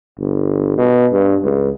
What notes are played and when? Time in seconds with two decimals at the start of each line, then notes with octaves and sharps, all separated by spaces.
0.19 G1
0.77 B2
1.13 G2
1.44 C#2